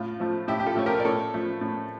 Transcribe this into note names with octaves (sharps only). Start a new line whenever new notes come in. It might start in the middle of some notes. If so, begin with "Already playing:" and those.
Already playing: A2 F4
F3 A3
A2 E4 G4
G4
F4 A4
F3 A3 C#5
G4 A#4
D5
A2 A4 C#5
F3 A3
A2